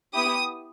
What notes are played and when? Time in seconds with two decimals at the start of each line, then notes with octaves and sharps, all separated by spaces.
0.13 B3 E4 G4 D#6